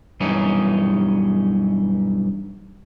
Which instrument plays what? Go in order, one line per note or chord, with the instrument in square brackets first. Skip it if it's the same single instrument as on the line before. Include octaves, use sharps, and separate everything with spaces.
[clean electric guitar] B1 G2 E3 C#4 D#4